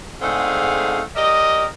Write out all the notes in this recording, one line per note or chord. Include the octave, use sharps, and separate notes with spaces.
G#2 D3 A3 C4 G#4 F5
G4 A#4 D5 D#5